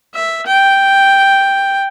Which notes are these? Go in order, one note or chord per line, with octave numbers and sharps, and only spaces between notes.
E5
G5